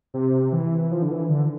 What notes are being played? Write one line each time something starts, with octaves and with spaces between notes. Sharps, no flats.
C3
E3
F3
D3
E3
D3